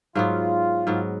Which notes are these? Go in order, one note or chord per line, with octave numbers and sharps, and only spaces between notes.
G#2 F#3 B3 F4
G#2 F#3 B3